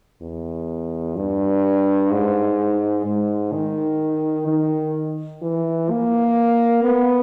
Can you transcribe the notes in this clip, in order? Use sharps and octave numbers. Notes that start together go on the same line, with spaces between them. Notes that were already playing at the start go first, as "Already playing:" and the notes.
E2
G2
G#2
G#2
D#3
D#3
E3
A#3
B3